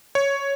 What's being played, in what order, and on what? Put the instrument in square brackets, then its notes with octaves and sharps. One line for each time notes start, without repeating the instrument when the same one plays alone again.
[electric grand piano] C#5